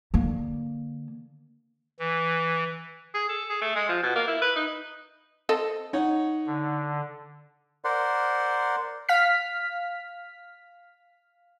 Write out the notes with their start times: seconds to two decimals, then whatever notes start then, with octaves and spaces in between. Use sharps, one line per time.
0.14 D3 A#3
1.99 E3
3.14 G#4
3.29 A4
3.50 G#4
3.62 A3
3.76 G#3
3.89 F3
4.03 B2
4.16 A#3
4.28 E4
4.42 B4
4.56 D#4
5.49 C4 A4 D#5
5.93 D#4 C#5 F#5
6.47 D3
7.85 A#4 C5 D5 F#5 C6
9.09 F5 F6 B6